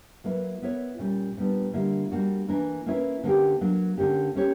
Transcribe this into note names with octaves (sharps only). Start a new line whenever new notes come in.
F#3 A#3 E4 B4
B3 E4 A#4 C#5
A#2 G3 C#4
A#2 G3 B3 D4
D3 G3 A#3 E4
G3 A#3 D4 F#4
E3 A#3 D4 A#4
A#3 C#4 E4 B4
D3 A#3 C#4 G4
F#3 A#3 D4
D3 A#3 C#4 G4
A#3 C#4 G4 C#5